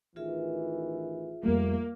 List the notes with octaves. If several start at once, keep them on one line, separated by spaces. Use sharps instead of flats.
A1 D#3 E3 F4 G#4 E5
F2 G3 A3 A#3